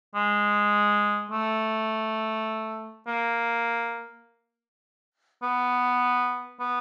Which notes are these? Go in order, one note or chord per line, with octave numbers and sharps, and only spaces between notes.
G#3
A3
A#3
B3
B3